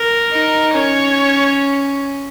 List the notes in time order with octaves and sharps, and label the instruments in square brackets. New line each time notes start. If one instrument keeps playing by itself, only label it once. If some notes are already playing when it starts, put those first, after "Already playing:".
Already playing: [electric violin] A#4
[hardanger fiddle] D#4
[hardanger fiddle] C#4 [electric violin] C#5